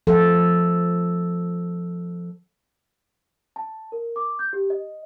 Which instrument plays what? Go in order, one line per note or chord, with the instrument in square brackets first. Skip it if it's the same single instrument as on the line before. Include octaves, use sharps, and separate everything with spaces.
[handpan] F3 A4
[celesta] A5
A#4
D6
G6
G4
D#5